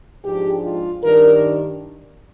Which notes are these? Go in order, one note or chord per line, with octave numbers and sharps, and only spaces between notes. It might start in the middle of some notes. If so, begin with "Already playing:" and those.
G#2 F3 G#3 D4 G4
F4
G2 D#3 G3 D4 A#4